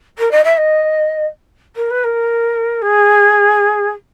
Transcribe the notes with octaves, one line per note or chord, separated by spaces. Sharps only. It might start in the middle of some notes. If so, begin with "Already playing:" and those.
A#4
D#5
E5
D#5
A#4
B4
A#4
G#4